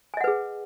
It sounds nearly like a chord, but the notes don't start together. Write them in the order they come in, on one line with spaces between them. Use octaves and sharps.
G#5 D#5 F#5 B4 G#4